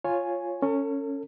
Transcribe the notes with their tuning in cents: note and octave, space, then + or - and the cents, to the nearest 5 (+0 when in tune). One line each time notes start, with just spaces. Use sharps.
F4 +0 C#5 -10 G#5 +0
C#4 +0 A4 +40